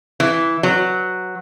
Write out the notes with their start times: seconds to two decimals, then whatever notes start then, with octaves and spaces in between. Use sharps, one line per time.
0.20 E3
0.63 F#3